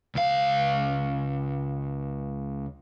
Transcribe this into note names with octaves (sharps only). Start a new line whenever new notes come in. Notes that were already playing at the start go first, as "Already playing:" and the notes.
C#2 F5